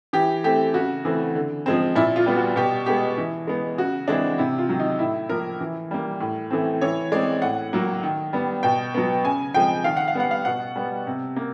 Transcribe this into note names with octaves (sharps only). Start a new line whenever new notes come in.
E3 G4
A3 C4 G4
C#3 F#4
E3 A3 C4
D3
F3 G#3 C4
A#2 E4
F4
G3 B3
F#4
B2 G4
G#3 B3 G4
E3
G#3 B3
C#3 F#4
E3 G#3 C4 D4
C3 E4
F4
D#3 F#3
D#4
A2 E4
F3 A#3 A#4
E3
G3 A#3
A2
E3 A3 C4
E3 C#5
G#3 C4 D5
A2 F#5
F#3 A#3
D#3
G3 B3
B2 G5
F#3 B3
C#3 G#5
F3 G#3 C4 G5
D#3 F5
F#5
F5
G3 B3 F#5
F5
B2 F#5
G3 B3
C3
A#3